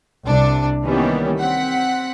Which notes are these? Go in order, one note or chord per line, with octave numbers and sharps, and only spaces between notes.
C2 C3 D4
D#3 E3 G3 A#3 B3 C#4
C4 F#5 B6